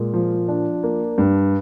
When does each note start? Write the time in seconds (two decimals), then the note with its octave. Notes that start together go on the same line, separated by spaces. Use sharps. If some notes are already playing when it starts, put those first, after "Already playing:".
Already playing: A#2 G#3
0.14 F3
0.48 D4
0.83 A#3
1.18 G2